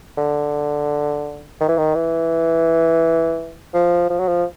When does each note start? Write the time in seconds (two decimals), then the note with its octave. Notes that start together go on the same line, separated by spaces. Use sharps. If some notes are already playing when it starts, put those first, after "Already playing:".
0.17 D3
1.60 D#3
1.68 E3
1.77 D#3
1.95 E3
3.74 F3
4.10 F3
4.19 F#3
4.28 F3